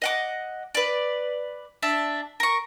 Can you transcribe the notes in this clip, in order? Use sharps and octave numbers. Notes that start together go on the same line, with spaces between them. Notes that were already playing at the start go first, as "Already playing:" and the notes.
D#5 F#5 D6
B4 D5
D4 E5 A5
A#4 C#6